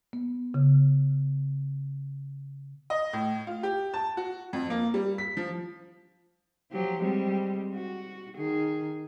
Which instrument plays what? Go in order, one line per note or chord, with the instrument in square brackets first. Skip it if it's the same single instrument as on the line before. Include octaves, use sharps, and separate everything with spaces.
[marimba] B3
C#3
[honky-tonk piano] D#5
A2
F4
G4
A5
F#4
F2
A#3
G3
B6
F3
[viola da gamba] F3 F#3 G4
G3 G#3 C4
F#4
D#3 G#4